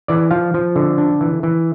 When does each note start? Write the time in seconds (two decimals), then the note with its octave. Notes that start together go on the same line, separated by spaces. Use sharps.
0.08 E3 D5
0.31 F3 F5
0.54 F3
0.76 D3
0.98 D4
1.21 E3
1.43 E3